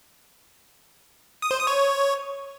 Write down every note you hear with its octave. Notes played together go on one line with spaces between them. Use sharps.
D#6
C5
D#6
C#5